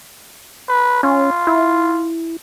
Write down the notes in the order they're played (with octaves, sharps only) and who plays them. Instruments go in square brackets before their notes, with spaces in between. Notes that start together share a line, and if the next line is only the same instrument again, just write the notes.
[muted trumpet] B4
[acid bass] C#4 [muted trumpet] F4
[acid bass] E4